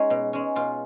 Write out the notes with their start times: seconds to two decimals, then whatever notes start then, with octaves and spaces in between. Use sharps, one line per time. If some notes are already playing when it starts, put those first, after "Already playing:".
Already playing: G#3 C#4 D#4
0.10 B2
0.33 G#3 C#4
0.56 B2 F4